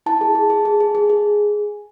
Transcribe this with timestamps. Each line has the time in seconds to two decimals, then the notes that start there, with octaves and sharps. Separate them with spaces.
0.06 E4 A5
0.21 G#4
0.35 G#4
0.50 G#4
0.65 G#4
0.80 G#4
0.95 G#4
1.10 G#4